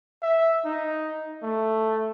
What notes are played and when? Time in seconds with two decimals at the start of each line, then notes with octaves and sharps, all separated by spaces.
0.22 E5
0.65 D#4
1.43 A3